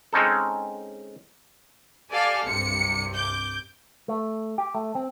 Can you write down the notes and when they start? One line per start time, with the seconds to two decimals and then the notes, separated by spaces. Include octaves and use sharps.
0.13 G#3 C4 C#4 D#4 A4
2.11 G4 A4 D5 F5 G#5
2.45 C2 G2 C3 C#7
3.15 D6 G6
4.08 A3
4.58 G4
4.75 A3
4.95 C4